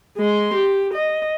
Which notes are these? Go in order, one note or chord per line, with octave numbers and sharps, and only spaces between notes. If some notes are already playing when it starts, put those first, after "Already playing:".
G#3 C6
G4
D#5